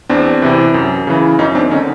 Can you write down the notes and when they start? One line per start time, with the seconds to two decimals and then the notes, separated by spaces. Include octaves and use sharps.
0.09 E2 C4 D4
0.42 C3 E3
0.74 F#2
1.07 C#3 E3
1.39 F#2 C#4 D#4
1.55 C4 D4
1.71 D3 C#4 D#4